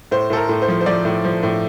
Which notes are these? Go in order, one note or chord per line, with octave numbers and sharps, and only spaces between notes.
A2 C5
A2 A4
A#4
A2
C5
F3
C5
F3 D5
A2
F3
A2